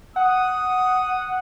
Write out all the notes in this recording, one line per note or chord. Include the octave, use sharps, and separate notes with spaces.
F#5 D#6